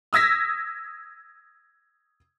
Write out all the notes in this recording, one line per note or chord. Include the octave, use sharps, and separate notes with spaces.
D#6 E6 G#6 A#6 B6